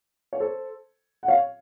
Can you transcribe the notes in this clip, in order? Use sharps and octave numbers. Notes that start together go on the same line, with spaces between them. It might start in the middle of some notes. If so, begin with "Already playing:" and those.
C#5
A4 C5
F#5
C#5 F5